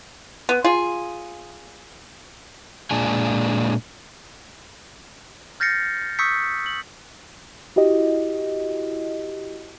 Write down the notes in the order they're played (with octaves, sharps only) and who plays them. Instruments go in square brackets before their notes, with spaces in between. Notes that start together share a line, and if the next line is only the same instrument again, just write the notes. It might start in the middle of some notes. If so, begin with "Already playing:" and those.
[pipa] B3
F4 G#4
[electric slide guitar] A#2 G#3 D4 G#5
[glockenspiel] F6 G6 A6 A#6 C7 C#7
C#6 D#6 E6 G6 B6 C#7
F#7
[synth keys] E4 F#4 G4 D#5